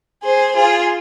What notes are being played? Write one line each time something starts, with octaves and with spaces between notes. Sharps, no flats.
G#4 C5
F4 G#4